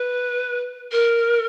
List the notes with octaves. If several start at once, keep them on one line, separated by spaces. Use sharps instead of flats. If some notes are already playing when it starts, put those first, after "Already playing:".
Already playing: B4
A#4